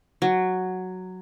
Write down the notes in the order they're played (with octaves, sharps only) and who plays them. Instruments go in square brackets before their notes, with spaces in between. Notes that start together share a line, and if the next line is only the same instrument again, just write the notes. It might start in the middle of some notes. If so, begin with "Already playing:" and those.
[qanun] F#3